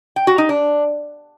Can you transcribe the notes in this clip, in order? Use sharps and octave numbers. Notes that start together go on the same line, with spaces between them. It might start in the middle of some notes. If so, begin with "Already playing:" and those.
G5
F#4
D#4
D4